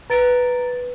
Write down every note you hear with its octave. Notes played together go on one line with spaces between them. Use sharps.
B4 A#5 A6 D7